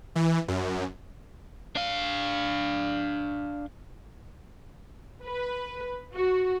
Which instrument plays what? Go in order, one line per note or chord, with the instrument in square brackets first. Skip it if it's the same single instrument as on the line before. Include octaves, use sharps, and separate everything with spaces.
[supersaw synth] E3
F#2
[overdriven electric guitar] D4 F5
[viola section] B4
F#4